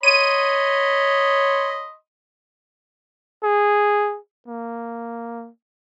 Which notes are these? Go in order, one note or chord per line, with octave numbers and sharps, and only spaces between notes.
C#5 D#5 B5 C6 D#7
G#4
A#3